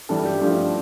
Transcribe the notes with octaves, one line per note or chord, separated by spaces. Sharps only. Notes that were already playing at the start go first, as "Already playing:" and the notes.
G2 E3 G3 D4 A4
G4
G2 F3 A3 D4